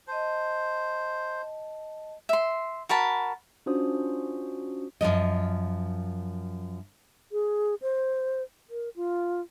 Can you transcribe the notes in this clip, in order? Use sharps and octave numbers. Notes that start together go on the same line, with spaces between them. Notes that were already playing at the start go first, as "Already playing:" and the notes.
C5 D#5 A5
E5 C6
F#4 A#4 A5 B5
C#4 D4 F4 F#4 C5 D#6
F#2 B2 F3 D#5
G#4
C5
A#4
F4